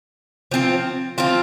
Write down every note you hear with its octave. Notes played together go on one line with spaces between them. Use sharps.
F3 C4 F4
F3 C4 F4